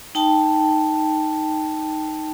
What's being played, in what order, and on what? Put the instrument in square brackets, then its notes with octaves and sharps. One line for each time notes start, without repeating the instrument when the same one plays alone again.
[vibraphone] D#4 G5 A5